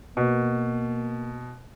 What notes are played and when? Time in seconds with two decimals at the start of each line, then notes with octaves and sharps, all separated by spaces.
0.17 B2 A#3